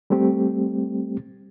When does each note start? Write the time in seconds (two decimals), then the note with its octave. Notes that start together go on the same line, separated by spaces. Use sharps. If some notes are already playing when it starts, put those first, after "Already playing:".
0.10 G3 A3 C4 G4